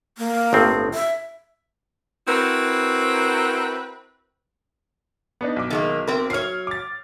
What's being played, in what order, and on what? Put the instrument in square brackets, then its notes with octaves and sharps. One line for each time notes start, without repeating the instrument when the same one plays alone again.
[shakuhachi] A#3
[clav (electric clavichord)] G1 A2 C4
[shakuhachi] E5
[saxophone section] C4 E4 F#4 A#4 B4
[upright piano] B3 D4 D#4
B1 D6
[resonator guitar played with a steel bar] D#3 G#3 A#3
C4 A#4
[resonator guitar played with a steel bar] F#3 C#5 [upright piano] F6 C7
[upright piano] D6 A6